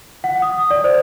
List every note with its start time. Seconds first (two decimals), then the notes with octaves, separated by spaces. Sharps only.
0.24 F#5
0.42 D#6
0.71 D5
0.84 C5